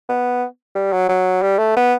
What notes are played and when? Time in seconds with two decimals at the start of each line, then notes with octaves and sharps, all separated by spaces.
0.09 B3
0.75 G3
0.92 F#3
1.08 F#3
1.42 G3
1.58 A3
1.76 B3